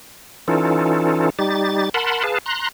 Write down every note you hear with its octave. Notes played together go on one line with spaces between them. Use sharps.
E3 C#4 D#4 F4 A4
G3 D#4 G4 A6
A#4 F#5 A5 B5 C6
G#4 B4 F5 A5
A#5 C6 F#6